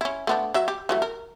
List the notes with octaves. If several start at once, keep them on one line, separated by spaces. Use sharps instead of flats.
C#4 E4
A3 B3 D4
F#3 E5
G4
E3 F#3 A3
A#4